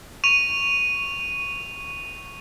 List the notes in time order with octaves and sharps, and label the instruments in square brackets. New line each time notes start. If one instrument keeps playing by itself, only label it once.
[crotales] C#6 D#7 F7